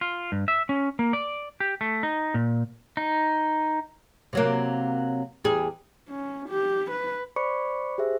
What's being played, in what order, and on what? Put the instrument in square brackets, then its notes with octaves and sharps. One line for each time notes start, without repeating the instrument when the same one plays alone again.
[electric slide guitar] F4
G2
E5
C#4
A#3
D5
G4
A3
D#4
A#2
[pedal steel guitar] D#4
[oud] C3 F#3 A#3
E2 G3 G#4
[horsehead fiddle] C#4
G4
B4
[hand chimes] C5 D5 B5 C#6 D6 C#7
G4 G#4 C5 E5